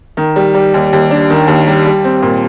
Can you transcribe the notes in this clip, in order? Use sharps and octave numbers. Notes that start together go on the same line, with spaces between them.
D#3
G3
G3
D#2
D#2
D4
D#3
D#2
G3
G3
C4
A#2